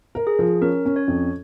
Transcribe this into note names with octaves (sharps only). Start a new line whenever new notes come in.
A#4
G#4
F3
C#4 A#4
C#4
C#5
F2